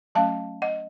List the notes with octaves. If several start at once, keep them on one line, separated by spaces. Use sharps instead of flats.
F#3 A3 C#4 F5 A5
D#5 F#5